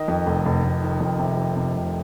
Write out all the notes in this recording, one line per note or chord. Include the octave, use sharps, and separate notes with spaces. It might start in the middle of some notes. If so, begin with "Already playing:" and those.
Already playing: D#3 D#5
F2
F1
F1
F1
D#3
F2
C3
F2
C3
F1